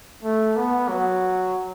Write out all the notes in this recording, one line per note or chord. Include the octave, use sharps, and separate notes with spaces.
A3
B3
F#3